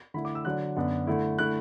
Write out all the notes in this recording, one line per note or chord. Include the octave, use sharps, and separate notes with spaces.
D3 A3 E4 B5
D6
E6
D3 F#3 D4 F#6
F#2 D3 B3 D4
D3 A3 E4
D3 A3 E4 F#6